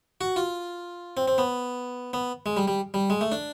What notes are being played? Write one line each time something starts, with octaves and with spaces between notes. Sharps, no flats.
F#4
F4
C4
C4
B3
B3
G#3
G3
G3
G3
G#3
A3
D4